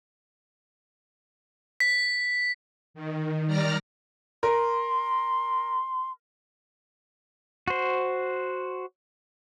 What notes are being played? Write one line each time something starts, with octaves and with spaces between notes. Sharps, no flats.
B6
D#3
D#3 G3 D5 A#5 F6 A#6
A#4 C6
F#4 C5